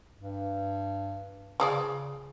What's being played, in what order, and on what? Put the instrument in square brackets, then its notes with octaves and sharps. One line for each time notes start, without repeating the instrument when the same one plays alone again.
[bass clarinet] G2
[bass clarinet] C#3 [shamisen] F3 G#4 D5